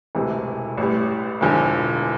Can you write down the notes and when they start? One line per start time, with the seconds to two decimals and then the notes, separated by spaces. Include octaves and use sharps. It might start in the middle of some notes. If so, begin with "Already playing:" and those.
0.15 E1 D2 C3 E3
0.77 A1 A2 G3
1.41 E1 E2 D3 F3